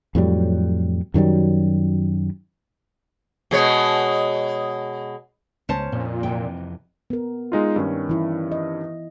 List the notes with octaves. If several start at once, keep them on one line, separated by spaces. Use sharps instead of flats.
F2 A2 F#3 G3
F#2 D#3 F#3 G3
B2 G#3 C#5
C#2 C#4 C5 A5
F2 A#2
F2 C3 E3 G5
B3 A#4
G#3 D#4 F4
G2 D#3 C#4
E3 E4
D#5